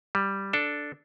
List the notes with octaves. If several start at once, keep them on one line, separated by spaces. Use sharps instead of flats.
G3
D4 A4